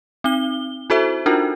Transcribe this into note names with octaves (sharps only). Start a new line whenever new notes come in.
C4 D#4 G7
E4 F#4 A4 C5 E5
D4 D#4 F4 F#4 A#4